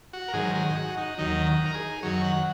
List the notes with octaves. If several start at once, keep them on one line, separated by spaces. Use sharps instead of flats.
F#4
A#4
G#2 D#3 F#3 G#4
G#4
D#4
F#4
D#4
D#2 D#3 F#3 D#4
D#4
A#4
G#4
F#2 D#3 F#3 C#5
F#5